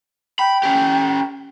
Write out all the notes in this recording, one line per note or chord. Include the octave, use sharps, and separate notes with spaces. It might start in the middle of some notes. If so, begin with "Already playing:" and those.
G5 B5
C#4 G4